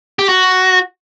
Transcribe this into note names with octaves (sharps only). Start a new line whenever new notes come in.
G4
F#4